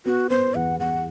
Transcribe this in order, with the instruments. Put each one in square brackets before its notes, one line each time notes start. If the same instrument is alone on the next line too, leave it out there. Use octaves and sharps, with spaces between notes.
[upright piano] B3 [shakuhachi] F#4
[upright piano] B3 [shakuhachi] C5
[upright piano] E2 [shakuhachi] F#5
[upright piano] E2 [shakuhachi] F#5